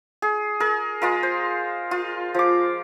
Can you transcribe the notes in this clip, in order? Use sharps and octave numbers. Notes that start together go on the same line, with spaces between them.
G#4
G#4 A#4
G#3 F4 A#4
C5
F4
F3 D6